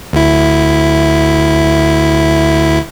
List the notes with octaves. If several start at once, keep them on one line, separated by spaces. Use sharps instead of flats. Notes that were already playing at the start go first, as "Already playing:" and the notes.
D2 E4